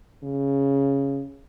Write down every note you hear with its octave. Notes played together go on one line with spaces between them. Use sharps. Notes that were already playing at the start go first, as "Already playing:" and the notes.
C#3